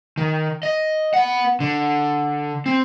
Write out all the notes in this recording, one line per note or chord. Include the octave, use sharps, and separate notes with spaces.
D#3
D#5
B3 F#5
D3
C4